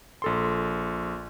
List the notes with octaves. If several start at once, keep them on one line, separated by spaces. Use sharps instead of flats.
A#1 A4 C6